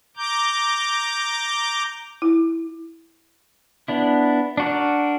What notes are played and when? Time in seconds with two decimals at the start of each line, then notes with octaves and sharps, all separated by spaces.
0.17 A#5 D6 G6
2.22 E4
3.88 B3 D4 E4
4.57 D4 F#4 A#4